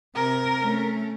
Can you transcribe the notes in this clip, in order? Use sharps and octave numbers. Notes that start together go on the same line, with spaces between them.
C3 A#4
A3 C#4